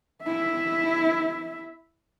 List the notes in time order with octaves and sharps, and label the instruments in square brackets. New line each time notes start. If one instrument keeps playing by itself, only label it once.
[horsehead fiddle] E4 E5